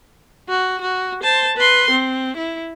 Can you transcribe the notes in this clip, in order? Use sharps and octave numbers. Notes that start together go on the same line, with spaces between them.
F#4
F#4
C5 A5
B4 C6
C4
E4